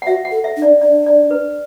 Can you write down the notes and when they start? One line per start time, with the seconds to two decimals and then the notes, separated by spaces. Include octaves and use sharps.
0.02 F#5
0.07 F#4 E5
0.25 F#5
0.31 A4
0.44 E5
0.57 D4
0.62 D5
0.81 D4 D5
1.06 D5
1.31 B4